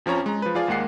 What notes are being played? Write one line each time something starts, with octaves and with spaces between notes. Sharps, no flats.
F2 F3 C#4 C#5 A#5
G#3 A#5
F3 B4
F3 F4 G#4 D5
D#2 G#3 A#3 F#5 C7